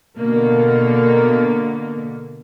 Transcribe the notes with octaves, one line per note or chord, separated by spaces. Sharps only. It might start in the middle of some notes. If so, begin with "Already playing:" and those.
B2 D3 A#3